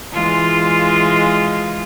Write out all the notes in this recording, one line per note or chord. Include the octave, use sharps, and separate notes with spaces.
E3 G#3 F4